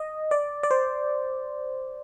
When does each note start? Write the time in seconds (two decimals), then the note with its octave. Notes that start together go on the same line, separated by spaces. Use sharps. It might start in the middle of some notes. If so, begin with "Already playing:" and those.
Already playing: D#5
0.31 D5
0.63 D5
0.71 C5